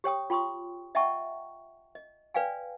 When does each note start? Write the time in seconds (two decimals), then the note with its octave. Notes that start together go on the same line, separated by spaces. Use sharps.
0.04 G4 C#5 G5 D#6
0.30 F4 G5 C6 C#6 D#6
0.95 D#5 E5 F#5 G5 A5 C#6
1.95 D#5
2.34 B4 D5 F5 G5 G#5